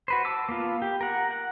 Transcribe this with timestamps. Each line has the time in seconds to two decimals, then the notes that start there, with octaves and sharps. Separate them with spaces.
0.08 F#4 B4 C5
0.25 A5 D6 E6
0.49 A#3 B3 F4
0.82 G4
1.01 A#4 F#5
1.31 F#5